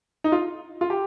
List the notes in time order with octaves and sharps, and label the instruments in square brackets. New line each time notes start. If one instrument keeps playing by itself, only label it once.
[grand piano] D#4
F4
F4
G4